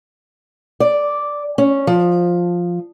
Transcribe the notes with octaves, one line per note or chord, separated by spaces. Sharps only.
D5
C#4
F3